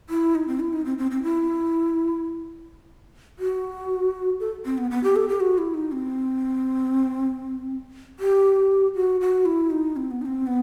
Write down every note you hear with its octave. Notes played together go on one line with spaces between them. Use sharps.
E4
D#4
C4
E4
D#4
C4
C4
C4
E4
F#4
A4
C4
B3
B3
G4
A4
G4
F#4
E4
D#4
C4
G4
F#4
F#4
E4
D#4
C4
B3
D#4
C4
B3